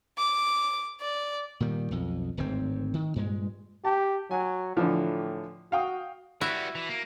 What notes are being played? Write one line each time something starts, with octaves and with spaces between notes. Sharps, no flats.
D6
D5
A#2 D#3 G3
B1 F2
D1 G#1 G#2 C4
D#3
G2 A#2 G#3
G4 A5
F#3 G#5
A2 D3 E3 F3
F#4 F5 G5 D#6
G3 B3 E4 F#4 E5
E3
A#3